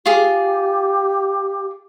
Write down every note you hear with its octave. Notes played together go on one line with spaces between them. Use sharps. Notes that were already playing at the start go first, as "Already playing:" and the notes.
F4 G4 G#4